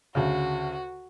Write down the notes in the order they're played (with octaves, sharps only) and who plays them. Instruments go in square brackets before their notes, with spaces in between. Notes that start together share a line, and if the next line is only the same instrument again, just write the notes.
[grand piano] D2 C#3 [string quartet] F#4